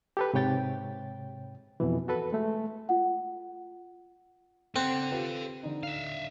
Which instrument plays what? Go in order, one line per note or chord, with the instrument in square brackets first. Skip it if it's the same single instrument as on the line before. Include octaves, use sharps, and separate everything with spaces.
[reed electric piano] G4 A4 B4
G#2 C3 C#5 G5 A6
F2 B2 E3
F#4 A4 B4
G#3 A3
[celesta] F4 F#5
[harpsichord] C4 [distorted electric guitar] A4 F#5 [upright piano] F#6
[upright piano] F4 G4 B4
D3 D#4
[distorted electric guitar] E5 F5